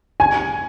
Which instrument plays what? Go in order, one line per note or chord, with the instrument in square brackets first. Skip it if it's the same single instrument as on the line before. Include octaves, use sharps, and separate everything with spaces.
[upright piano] G#5